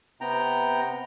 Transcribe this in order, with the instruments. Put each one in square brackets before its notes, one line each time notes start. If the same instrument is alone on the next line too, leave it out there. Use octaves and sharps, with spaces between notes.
[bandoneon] C3 B3 G5 A#5